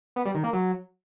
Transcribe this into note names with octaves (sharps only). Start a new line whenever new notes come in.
B3
G3
D#3
A#3
F#3